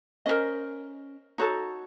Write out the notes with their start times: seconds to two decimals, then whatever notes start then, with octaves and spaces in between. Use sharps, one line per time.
0.26 C#4 F4 A#4 C5 D#5
1.38 D#4 F#4 A4 C#5